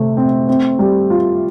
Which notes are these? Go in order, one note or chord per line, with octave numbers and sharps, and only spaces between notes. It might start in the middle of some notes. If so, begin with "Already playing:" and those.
Already playing: C3 A3
C4
C4
G3
F4